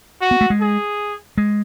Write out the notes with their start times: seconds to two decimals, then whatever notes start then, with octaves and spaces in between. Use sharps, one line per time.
0.21 F#4
0.31 B3
0.41 A3
0.50 G#3
0.61 G#4
1.38 G#3